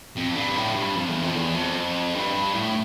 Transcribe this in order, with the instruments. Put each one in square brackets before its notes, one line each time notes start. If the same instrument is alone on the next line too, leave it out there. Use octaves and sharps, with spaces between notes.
[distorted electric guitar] F2
G2
A2
G2
F2
E2
F2
E2
F2
G2
A2